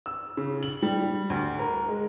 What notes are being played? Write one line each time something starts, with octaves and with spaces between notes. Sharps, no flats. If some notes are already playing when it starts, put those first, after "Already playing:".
E6
C#3
F#7
G3
D2
A#4
G#3